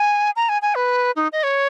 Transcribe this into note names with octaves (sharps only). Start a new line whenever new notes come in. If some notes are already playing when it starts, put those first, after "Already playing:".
Already playing: G#5
A#5
G#5
G#5
B4
D#4
D#5
C#5